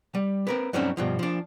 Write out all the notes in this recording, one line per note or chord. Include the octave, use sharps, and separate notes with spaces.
G3
C4 A#4 B4
G2 F#3 A3 C4 C#4 D#4
G2 B2 F3
F3 D4